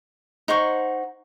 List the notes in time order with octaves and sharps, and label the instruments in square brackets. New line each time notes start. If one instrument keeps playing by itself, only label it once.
[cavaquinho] D#4 C5 F#5 C#6